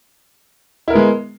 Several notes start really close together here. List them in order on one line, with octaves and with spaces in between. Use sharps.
E4 A#4 B3 G#3